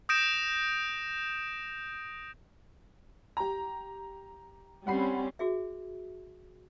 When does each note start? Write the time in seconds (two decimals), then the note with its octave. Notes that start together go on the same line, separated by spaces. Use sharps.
0.09 D#6 G6 A#6 D7 E7
3.37 G4 A#5
4.87 G3 C4 C#4 F#5 B5 C7
5.39 F#4 G#4 E5